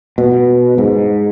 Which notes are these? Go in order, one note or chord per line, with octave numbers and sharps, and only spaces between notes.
B2
G#2